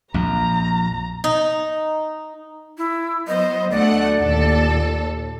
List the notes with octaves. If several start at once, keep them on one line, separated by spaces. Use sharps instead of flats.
A#1 F2 A#5
D#4
E4
F#3 B3 C5 D#5
D2 A3 D5 F#5
D#2 A#2 A4